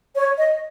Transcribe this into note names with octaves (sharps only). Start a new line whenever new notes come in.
C#5
D#5